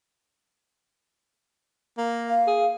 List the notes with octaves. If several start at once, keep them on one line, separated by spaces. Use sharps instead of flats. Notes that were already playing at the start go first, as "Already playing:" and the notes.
A#3
F5
G#4